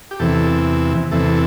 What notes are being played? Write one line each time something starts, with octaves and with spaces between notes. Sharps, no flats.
G4
E2 C3 E3 A4
E2 C3 E3 A4